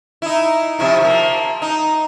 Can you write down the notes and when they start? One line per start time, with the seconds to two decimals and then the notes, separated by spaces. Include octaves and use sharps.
0.22 D#4 E4
0.79 C3 F3 E4
1.01 F3 A#3
1.62 D#4